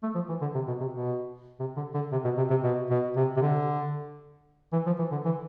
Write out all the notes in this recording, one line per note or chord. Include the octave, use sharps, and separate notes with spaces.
A3
F3
E3
D3
C3
B2
C3
B2
C3
D3
D3
C3
B2
C3
C3
B2
B2
C3
C3
D3
E3
F3
E3
D3
E3